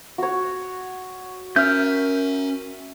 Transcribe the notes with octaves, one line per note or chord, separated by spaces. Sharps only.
F#4 C#5
C#4 A#4 E5 F6 G6